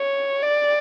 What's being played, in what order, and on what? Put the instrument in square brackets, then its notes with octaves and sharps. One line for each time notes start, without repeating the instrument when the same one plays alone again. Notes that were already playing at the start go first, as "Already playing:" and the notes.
Already playing: [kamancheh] C#5
D5